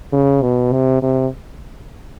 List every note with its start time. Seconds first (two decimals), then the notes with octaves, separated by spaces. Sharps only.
0.13 C#3
0.42 B2
0.73 C3
1.02 C3